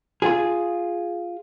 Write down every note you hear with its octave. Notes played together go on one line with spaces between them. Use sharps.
F4 G#4